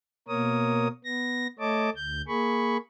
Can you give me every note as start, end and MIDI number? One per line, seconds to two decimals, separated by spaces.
0.28 0.88 47
0.28 0.88 58
0.28 0.88 70
0.28 0.88 73
0.28 0.88 87
1.05 1.47 59
1.05 1.47 94
1.59 1.90 57
1.59 1.90 73
1.59 1.90 75
1.59 1.90 81
1.59 1.90 86
1.96 2.22 38
1.96 2.22 91
2.28 2.77 58
2.28 2.77 68
2.28 2.77 83
2.28 2.77 85